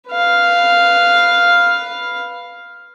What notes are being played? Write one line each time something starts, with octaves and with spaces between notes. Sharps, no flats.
B4 F5